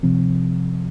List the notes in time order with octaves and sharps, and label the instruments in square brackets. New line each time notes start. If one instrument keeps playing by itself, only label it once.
[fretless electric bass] C3 F3 C4